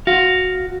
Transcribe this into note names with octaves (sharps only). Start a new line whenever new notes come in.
F#4 F5